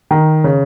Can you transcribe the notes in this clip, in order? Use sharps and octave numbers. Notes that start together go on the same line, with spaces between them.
D#3
C#3